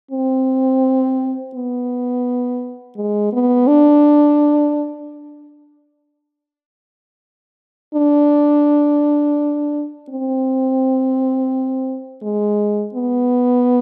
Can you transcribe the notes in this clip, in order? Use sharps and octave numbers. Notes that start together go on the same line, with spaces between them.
C4
B3
G#3
B3
D4
D4
C4
G#3
B3